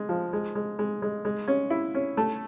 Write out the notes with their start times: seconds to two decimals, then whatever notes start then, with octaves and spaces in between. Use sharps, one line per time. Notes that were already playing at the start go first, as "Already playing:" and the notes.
Already playing: G#3
0.09 F3
0.33 G#3
0.55 G#3
0.79 G#3
1.02 G#3
1.25 G#3
1.48 C#4
1.70 E4
1.95 C#4
2.17 A3